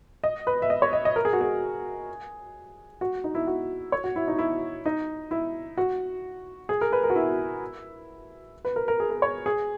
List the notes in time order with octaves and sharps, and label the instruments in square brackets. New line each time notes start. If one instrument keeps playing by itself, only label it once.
[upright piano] D#5
B4
E5
D#5
C#5
D#5
D#5
A#4
G#4
F#4
G#4
F#4
D#4
E4
F#4
C#5
F#4
E4
D#4
E4
D#4
E4
F#4
G#4
A#4
B4
A#4
F#4
E4
B4
A#4
A#4
G#4
A#4
C#5
G#4